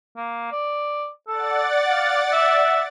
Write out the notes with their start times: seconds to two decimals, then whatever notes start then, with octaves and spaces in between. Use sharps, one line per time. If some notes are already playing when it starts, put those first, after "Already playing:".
0.17 A#3
0.52 D5
1.27 A4 D5 F#5 A6
1.91 F5
2.32 E5